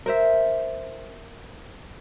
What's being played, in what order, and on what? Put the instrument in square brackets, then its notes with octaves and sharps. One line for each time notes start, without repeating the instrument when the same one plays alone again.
[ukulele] A#4 C5 E5